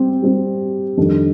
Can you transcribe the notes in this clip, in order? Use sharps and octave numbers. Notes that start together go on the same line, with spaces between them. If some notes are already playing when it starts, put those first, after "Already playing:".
Already playing: G3 C4 G4
G3 C4 G4
F2 D#3 G3 D4 A4